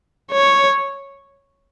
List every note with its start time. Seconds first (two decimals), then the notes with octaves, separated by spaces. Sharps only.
0.32 C#5